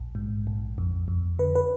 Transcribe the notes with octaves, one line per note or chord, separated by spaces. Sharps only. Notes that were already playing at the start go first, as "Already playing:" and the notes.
Already playing: A#1
G#2
A#1
F2
F2
D3 B4
B4